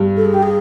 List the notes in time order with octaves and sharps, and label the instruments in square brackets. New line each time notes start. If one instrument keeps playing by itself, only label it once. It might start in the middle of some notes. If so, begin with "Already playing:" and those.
Already playing: [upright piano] G2
[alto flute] A4
G#4
G4
G#4